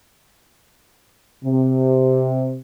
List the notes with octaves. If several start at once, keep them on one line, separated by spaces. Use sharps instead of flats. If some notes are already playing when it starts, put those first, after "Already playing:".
C3